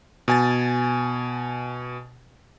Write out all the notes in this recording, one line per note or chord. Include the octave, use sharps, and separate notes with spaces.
B2 G#5 A6